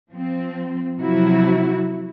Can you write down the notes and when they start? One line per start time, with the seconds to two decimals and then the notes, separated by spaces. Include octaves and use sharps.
0.11 F3 C4
1.00 C3 F3 F#3 E4 F#4